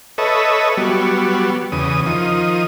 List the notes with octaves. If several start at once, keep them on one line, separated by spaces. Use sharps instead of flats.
A4 B4 C#5 D#5 E5
F#3 G3 B3
E2 C#3 D#6
D#3 F3 D#6